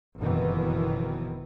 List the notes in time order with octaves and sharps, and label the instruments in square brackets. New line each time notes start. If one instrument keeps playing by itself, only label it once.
[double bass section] F#1 F2 B2 D#3 E3